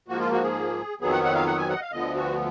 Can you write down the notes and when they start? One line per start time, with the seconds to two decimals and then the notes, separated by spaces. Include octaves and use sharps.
0.08 G#2 F3 A#3 F#4
0.20 F4
0.32 F#4
0.43 G#4
1.01 F2 D#3 F#3 B3 G#4
1.12 F#5
1.23 F#5
1.35 F5
1.46 F#5
1.58 G#5
1.69 F#5
1.76 D#5
1.81 F5
1.92 D2 D3 F3 B3 D#5
2.15 F#4